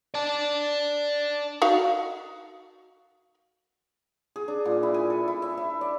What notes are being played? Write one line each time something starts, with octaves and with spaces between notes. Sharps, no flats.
D5 A5
D#4 F#4 F5
G#4
D4
A#2
E4
G#5
A4
E4
E5
E5
D5